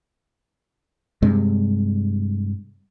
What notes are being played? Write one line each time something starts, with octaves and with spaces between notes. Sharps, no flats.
G2 C3 G#3